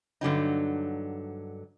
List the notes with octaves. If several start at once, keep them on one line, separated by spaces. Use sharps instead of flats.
G2 D3 F#3 D#4